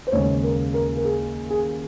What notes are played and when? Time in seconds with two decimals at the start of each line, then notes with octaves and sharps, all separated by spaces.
0.07 C5
0.12 D#2 C#3 G#3 C#4 C#5
0.43 A#4
0.74 A#4
0.97 A#4
1.05 G#4
1.50 G#4